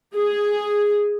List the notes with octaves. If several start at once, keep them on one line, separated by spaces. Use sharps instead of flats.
G#4